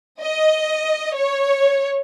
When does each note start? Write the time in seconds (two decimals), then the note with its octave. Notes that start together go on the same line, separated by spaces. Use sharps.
0.21 D#5
1.15 C#5